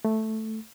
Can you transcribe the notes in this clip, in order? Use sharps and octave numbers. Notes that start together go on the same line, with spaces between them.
A3